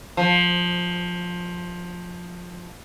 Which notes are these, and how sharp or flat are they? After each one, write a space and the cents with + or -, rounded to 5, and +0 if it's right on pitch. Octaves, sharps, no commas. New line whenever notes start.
F3 +15